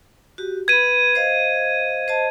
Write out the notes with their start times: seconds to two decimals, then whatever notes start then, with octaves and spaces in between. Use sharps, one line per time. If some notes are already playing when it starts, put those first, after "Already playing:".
0.38 F#4 G4
0.68 B4 B5 G#6 D#7
1.15 C5 D#5 F5
2.08 C5 D#5 A5